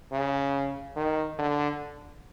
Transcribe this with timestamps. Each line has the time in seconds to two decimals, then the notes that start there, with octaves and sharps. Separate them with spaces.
0.12 C#3
0.96 D#3
1.39 D3